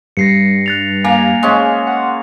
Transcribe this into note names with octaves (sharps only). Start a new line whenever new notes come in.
G2 A#6 C7 C#7
F#6 A6 F7
A#3 G#5 F7
G#3 C#4
F#5